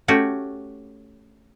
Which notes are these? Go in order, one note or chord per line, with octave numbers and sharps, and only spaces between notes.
A3 C#4 F#4 G4